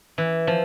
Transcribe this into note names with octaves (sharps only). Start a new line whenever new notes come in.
E3
F3